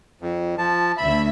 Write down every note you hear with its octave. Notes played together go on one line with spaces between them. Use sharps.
F2
F3 A5
D2 E5 B5